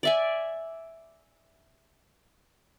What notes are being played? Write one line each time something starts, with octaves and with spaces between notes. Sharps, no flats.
D5 E5 G#5